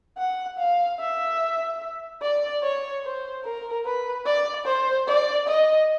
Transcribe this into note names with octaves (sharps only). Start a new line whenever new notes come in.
F#5
F5
E5
D5
C#5
C5
A#4
B4
D5
C5
D5
D#5